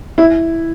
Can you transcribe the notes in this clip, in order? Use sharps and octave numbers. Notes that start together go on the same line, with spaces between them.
E4